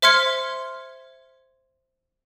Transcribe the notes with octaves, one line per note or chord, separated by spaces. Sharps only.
C5 E5 C6 F6 G#6 C#7